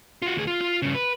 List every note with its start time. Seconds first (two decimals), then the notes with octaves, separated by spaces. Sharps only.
0.22 F4 F#4
0.36 D2 G#4
0.47 F4
0.61 F4
0.82 G2 C#3
0.95 B4